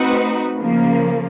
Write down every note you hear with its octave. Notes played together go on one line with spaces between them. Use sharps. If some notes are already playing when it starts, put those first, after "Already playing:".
Already playing: A3 C4 D#4 F#4 B4
C#3 F3 A#3